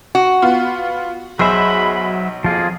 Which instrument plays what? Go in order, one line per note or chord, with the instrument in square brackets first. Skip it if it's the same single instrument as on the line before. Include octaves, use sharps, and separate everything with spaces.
[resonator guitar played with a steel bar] F#4
[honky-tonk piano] B3 F4
[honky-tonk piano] B1 [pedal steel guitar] F#3 C5 E5 [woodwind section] G#4 B5
[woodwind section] F2 A#3 G#4 [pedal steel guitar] F3 F4